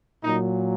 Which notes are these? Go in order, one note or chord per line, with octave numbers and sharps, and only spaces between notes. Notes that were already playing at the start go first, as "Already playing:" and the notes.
A#2 F#3 D#4